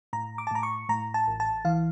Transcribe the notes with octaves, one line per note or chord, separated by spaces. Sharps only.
A2 A#5
D6
A5
A2 A#5
C#6
A2 A#5
A5
A1
A5
E3 F5